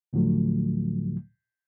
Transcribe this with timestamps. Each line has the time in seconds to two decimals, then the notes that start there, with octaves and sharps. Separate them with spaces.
0.13 D2 A2 D3 F3 F#3 A3